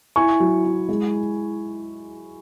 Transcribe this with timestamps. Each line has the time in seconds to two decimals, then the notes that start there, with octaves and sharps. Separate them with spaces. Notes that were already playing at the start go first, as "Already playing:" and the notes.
0.16 E4 G#5 C#6
0.40 F#3
0.65 E4
0.89 G#3